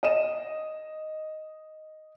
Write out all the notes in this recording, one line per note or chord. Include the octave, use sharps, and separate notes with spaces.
D#5 D#7 E7